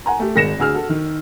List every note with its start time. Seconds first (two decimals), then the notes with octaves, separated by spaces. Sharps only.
0.06 F#5 G#5 A#5
0.19 A3 G4
0.36 G#1 G#3 A#6 C#7 E7
0.59 D2 G#4 E6 F6
0.74 F#4 A4
0.89 D#3